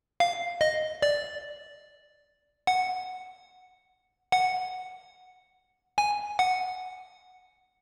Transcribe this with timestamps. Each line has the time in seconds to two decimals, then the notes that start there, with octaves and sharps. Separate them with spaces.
0.20 F5
0.61 D#5
1.02 D5
2.67 F#5
4.32 F#5
5.98 G#5
6.39 F#5